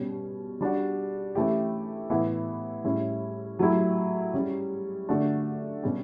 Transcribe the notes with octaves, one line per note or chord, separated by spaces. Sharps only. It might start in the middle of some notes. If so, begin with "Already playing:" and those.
Already playing: B2 G3 C#4
G3 D4 F#4
E3 A3 C#4 E4 G4
A2 E3 B3 E4
A2 G3 C#4 E4
F#3 A3 E4 G4
G3 C#4 G4
D3 A3 D4 F#4
B2 G3 C#4 G4